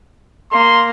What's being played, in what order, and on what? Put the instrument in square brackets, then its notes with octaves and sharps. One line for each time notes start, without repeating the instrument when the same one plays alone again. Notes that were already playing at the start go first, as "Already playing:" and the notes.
[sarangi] A#3 [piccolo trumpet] C6